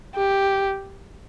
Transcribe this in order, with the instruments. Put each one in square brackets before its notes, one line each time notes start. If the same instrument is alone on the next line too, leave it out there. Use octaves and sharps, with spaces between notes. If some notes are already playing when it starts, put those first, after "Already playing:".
[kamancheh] G4